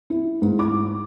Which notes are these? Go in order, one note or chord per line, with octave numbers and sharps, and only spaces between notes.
E4
G#2
D6